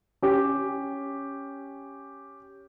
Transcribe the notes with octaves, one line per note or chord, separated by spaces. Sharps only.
C#4 G4